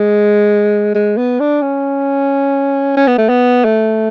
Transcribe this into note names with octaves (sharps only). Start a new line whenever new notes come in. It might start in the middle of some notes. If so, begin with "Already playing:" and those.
Already playing: G#3
G#3
B3
D4
C#4
C#4
B3
A3
B3
A3